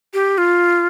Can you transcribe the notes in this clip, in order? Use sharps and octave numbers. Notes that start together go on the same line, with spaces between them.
G4
F4